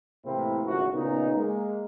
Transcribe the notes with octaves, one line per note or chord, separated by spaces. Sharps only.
A2 C3 E3 A#3 C4 E4
G#1 A2 C#3 F3 F#4
A#2 C#3 B3 D#4
G#3 A#3